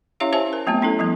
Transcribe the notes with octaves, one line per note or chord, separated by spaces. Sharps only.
C#4 E4 G4 C#5 E5 F5
G4 C5 C#5 E5 G#5 A5
A#4
F#3 A3 B3 C4 F4
C#4 E4 A4
F3 G3 B3